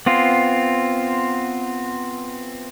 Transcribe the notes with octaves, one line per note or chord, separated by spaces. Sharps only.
B3 C4 F4